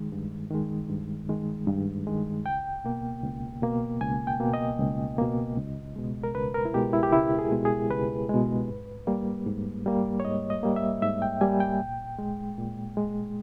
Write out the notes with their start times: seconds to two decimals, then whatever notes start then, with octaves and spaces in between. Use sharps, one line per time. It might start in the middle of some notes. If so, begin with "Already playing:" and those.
Already playing: D#3 G#3
0.12 G2
0.50 D#3 G#3
0.90 G2
1.29 D#3 G#3
1.67 G2
2.07 D#3 G#3
2.45 C#2 G5
2.85 B2 A#3
3.23 C#2
3.63 B2 A#3
4.01 C#2 G#5
4.27 G5
4.40 B2 A#3
4.54 D#5
4.79 C#2
5.18 B2 A#3
5.57 C#2
5.96 B2 G#3
6.24 A#4
6.35 C#2 B4
6.54 A#4
6.65 E4
6.74 B2 G#3 G4
6.93 E4
7.03 G4
7.13 C#2 E4
7.39 G#4
7.52 B2 G#3
7.65 G#4
7.90 C#2 B4
8.29 B2 G#3
8.68 G#2
9.07 G3 A#3
9.46 G#2
9.86 G3 A#3
10.20 C#5
10.24 G#2 D#5
10.50 D#5
10.63 G3 A#3
10.76 E5
11.02 G#2 E5
11.22 G5
11.41 G3 A#3 G#5
11.60 G5
11.80 A#2
12.19 G#3
12.58 A#2
12.97 G#3